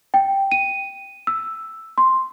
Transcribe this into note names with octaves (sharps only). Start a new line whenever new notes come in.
G5
D#7
E6
C6